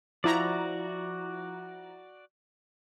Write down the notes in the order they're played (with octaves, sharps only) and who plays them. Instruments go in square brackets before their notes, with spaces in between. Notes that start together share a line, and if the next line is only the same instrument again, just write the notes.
[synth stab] F3 E4 A#5 [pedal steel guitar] F#4 D5